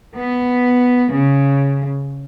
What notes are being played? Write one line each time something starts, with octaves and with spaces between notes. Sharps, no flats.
B3
C#3